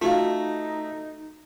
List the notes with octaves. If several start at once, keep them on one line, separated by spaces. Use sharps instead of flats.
A3 D#4 F4 F#4 F5